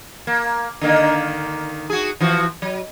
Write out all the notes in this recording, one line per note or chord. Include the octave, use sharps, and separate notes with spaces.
A#3
D3 D#3 A#3
F#4 G#4
E3 F3 F#4
F#3